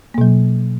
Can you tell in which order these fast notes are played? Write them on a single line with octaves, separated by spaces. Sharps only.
A#3 B2 F#3